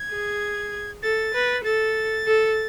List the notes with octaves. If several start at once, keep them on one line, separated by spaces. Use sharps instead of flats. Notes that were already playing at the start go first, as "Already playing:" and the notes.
Already playing: G#6
G#4
A4 A6
B4
A4 A6
A4